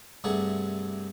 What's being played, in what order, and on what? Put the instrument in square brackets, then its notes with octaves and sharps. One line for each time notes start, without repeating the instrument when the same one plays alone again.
[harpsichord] G2 C3 A3 G#4 F#5